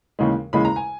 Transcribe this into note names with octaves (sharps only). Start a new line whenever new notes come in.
D#2 C#3 E3 G#3
D#2 C#3 E3 G#3 B5
A#5
G#5